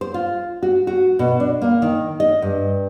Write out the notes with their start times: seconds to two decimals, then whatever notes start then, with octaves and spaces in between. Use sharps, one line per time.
0.01 C5
0.14 F4
0.63 F#4
0.87 F#4
1.19 B2
1.40 D4
1.62 A#3
1.82 D#3
2.20 D#5
2.42 G2